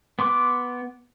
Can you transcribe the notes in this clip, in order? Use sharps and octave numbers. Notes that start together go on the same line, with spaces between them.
B3 C6 D6 F#6